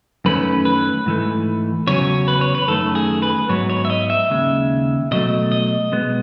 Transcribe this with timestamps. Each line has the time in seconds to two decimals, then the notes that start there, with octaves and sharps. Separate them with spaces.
0.25 F#2 D#3 A3 C#4 B4
0.65 B4
1.06 G#2 E3 A3
1.87 E2 C#3 F#3 C#4 C#5
2.28 B4
2.41 C#5
2.55 B4
2.68 F#2 D#3 A3 A4
2.95 G#4
3.22 B4
3.49 G#2 F#3 B3 C#5
3.70 C#5
3.85 E5
3.90 D#5
4.10 E5
4.30 D#2 C#3 G#3
5.11 B2 F#3 A3 D#5
5.52 D#5
5.92 B2 G#3 B3